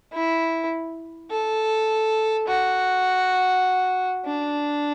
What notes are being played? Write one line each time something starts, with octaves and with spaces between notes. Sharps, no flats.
E4
A4
F#4
D4